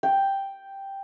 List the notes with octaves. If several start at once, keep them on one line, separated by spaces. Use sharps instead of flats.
G5